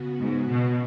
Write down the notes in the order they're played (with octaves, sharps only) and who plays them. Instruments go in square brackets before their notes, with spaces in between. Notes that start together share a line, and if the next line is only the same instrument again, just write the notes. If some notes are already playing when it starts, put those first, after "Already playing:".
Already playing: [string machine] C#3 B3 F#4
[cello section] G#2
B2